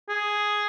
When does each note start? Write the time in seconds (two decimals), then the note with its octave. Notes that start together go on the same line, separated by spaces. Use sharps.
0.09 G#4